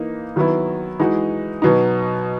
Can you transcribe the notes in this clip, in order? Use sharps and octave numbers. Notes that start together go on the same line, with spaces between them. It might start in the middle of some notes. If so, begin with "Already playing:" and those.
Already playing: E3 A#3 D#4
D#3 F#3 B3 E4
E3 G#3 D#4 F#4
B2 F#3 B3 D#4